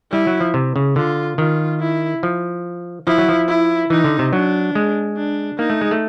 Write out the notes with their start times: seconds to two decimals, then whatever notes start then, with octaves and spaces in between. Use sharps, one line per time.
0.12 G3 E4
0.27 F#3
0.40 F3
0.54 C3
0.76 C#3
0.96 D3 F4
1.38 D#3 F4
1.80 E4
2.23 F3
3.07 F3 E4
3.18 F#3
3.29 F3
3.48 E4
3.90 E3 D#4
4.04 D3
4.19 C3
4.33 F#3 D4
4.75 G#3
5.17 D4
5.58 A#3 D#4
5.70 A3
5.81 G#3
5.91 A3